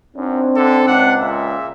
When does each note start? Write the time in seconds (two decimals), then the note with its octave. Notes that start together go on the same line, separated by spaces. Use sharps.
0.17 F#2 C4 D4 D#4
0.56 D3 A4
0.87 C#2 D4 F#5
1.21 A#2 E5